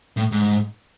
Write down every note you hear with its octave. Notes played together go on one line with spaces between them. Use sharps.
A2
G#2